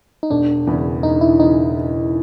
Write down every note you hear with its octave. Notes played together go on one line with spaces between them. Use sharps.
D#4
E1 D4
E2 C#3 E3
E1 D#4
E4
C#3 E3 D#4